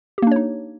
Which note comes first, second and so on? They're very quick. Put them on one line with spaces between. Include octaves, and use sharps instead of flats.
G4 A#3 D4 C#5 D#4